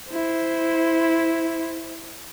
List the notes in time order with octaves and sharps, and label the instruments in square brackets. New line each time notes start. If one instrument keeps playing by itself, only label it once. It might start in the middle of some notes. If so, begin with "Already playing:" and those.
[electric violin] E4 C5